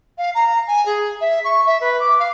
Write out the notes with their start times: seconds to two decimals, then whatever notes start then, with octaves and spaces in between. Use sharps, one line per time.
0.18 F5
0.35 A#5
0.68 G#5
0.86 G#4
1.21 E5
1.44 C#6
1.66 E5
1.81 B4
2.00 D6
2.19 F5